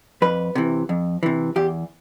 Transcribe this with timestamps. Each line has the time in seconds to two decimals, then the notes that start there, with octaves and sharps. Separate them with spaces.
0.22 F2 B4
0.55 C3 E3
0.89 F2
1.23 C3 E3
1.56 E2 G4